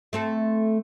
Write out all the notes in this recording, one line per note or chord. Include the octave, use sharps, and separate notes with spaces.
A3 C4 A4